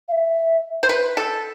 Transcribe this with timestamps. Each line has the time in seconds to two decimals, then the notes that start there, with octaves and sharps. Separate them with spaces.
0.08 F5
0.12 E5
0.83 C5
0.89 B4
1.17 A4